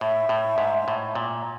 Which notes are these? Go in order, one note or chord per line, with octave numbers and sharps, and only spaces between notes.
A2 E5
A2
G#2
A2
A#2